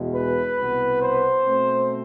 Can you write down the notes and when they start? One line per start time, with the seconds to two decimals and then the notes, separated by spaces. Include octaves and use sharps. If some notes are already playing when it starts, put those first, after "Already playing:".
Already playing: E2 B2 G#3
0.15 B4
0.58 C2 B2 B3
1.02 C5
1.45 B2 A3 C4